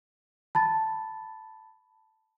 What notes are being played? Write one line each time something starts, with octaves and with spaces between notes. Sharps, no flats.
A5 B5 A6